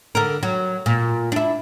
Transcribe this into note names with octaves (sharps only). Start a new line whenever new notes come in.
D3 A#4
F#3
A#2
D4 E4